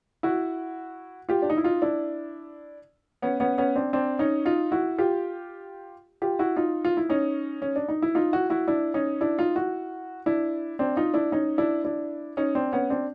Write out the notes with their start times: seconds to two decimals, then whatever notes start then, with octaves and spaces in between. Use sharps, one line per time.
0.23 E4 F#4
1.29 F4 G4
1.42 D4
1.50 D#4
1.57 E4
1.64 D#4 F4
1.82 D4 E4
3.22 B3 C#4
3.40 B3 C#4
3.58 B3 C#4
3.76 C4 D4
3.93 C4 D4
4.19 C#4 D#4
4.45 D#4 F4
4.72 E4 F#4
4.98 F4 G4
6.22 F4 G4
6.39 E4 F#4
6.56 D#4 F4
6.85 F4
6.97 E4
7.09 C#4 D#4
7.62 C#4
7.76 D4
7.89 D#4
8.02 E4
8.15 D#4 F4
8.32 E4 F#4
8.50 E4 F#4
8.68 D4 E4
8.94 C#4 D#4
9.21 D4 E4
9.39 D#4 F4
9.55 E4 F#4
10.26 D4 E4
10.79 C4 D4
10.97 D#4 F4
11.14 D4 E4
11.32 C#4 D#4
11.58 D4 E4
11.85 D4 E4
12.37 C#4 D#4
12.55 C4 D4
12.73 B3 C#4
12.90 C4 D4